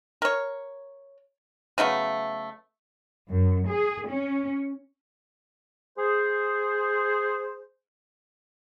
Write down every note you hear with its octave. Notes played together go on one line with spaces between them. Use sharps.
A#4 C#5
C#3 F#3 A3 B3
F#2
G#4
C#4
G#4 C5